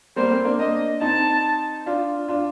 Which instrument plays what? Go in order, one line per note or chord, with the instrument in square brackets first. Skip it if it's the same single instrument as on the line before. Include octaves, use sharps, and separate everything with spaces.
[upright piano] G3 A#3 [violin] C5
[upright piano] A3 C4
A#3 D4
[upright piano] A#3 D4 [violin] D#5
[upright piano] C4 D#4 [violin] A5
[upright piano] D4 F4
D4 F4